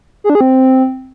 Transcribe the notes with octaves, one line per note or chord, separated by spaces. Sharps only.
G#4
D4
G#4
C4